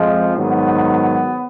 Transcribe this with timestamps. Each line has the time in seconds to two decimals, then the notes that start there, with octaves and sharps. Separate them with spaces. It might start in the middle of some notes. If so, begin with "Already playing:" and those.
Already playing: F2 F3 G#3
0.36 G#2 D#3 F#3 B3